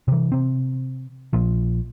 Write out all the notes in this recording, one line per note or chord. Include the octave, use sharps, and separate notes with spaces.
C3 E3
C3 C4
A#1 A#2 F3